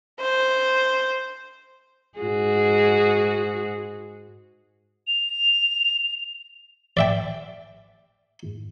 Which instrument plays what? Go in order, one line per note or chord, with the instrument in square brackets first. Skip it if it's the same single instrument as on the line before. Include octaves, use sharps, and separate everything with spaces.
[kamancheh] C5
[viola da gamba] G#2 F#4 G#4
[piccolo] F7
[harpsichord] D5 E5 G5